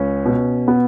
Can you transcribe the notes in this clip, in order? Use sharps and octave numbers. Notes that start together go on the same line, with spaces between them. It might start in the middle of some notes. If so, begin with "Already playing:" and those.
Already playing: C#2 C#4
B2
B3